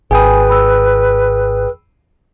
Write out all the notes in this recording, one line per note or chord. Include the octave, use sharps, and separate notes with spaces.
G#1 G#4 B4 G5 G#5 B5 D#6
B5 E6